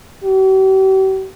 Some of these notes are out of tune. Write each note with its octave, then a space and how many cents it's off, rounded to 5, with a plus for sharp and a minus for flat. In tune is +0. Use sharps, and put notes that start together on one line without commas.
G4 -45